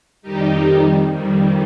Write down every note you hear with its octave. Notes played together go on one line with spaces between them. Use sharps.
F2 D#3 G3 D#4 G4
F2 D#3 G3